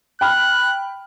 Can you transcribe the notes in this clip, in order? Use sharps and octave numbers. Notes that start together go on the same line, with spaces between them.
G5 B5 F6 F#6